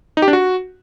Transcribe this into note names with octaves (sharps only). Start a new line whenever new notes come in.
D#4
G4
D4
F#4